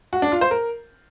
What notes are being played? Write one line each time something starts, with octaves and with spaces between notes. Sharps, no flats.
F#4
D4
F4
C5
A#4